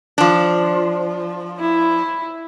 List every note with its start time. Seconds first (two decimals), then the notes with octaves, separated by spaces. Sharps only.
0.18 F3 D4
1.60 E4